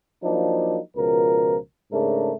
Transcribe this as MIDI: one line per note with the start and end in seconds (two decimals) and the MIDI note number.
0.23 0.78 53
0.23 0.78 54
0.23 0.78 58
0.23 0.78 62
0.23 0.78 63
0.96 1.56 37
0.96 1.56 47
0.96 1.56 53
0.96 1.56 70
1.92 2.32 44
1.92 2.32 49
1.92 2.32 57
1.92 2.32 62
1.92 2.32 70